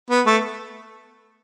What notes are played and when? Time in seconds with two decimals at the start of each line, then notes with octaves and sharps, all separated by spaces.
0.10 B3
0.26 A3